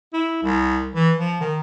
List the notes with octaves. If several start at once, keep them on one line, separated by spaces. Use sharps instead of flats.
E4
C2
E3
F3
D#3